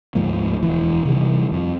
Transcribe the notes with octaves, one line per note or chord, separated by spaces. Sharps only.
D2 G#2 F3 A#3
E1 E3
C3 D#3 E3 G3
F2